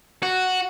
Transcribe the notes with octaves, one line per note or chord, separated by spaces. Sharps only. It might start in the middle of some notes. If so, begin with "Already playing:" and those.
F#4